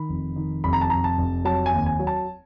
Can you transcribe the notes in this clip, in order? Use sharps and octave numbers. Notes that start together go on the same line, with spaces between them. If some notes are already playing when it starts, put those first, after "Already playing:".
Already playing: D#3 B5
F1
D#3
F1 B5
A#5
A5
F1 A#5
A5
F1
F#3 A5
G#5
D#2
G#5
F#3
A5